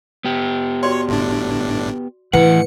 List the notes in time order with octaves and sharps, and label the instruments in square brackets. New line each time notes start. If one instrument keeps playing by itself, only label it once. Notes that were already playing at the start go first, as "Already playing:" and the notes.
[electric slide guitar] B3 G4
[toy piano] F#4 D5 C6 [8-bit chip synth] C#5
[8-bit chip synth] G1 A2 D4
[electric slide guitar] A2 F#5 [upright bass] E3 [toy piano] B4 [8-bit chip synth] C#7